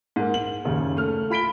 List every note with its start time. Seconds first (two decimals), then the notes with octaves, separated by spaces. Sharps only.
0.16 G#2 A#3
0.34 F#7
0.65 F#1 D#2 C#3
0.97 A3 F6
1.30 F4 B5 B6 D7 G7